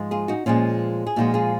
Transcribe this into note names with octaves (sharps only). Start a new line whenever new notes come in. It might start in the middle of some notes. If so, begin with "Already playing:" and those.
Already playing: G#2 F3 G#3
F4 G#4
D#4 F#4
A#2 F3 G#3 C#4 F4
G#4
A#2 F3 G#3 D#4 F#4
F4 G#4